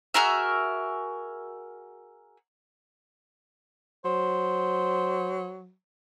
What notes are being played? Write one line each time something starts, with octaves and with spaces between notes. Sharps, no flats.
F#4 G#4 A#4 E5
F#3 C5